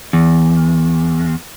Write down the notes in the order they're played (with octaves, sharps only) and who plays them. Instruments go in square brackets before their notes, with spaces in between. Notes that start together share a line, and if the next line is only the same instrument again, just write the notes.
[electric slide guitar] E2